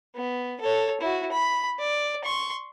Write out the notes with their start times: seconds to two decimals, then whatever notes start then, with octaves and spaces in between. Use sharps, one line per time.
0.16 B3
0.61 A4 C#5
1.01 E4 F#4
1.32 B5
1.80 D5
2.24 C6 C#6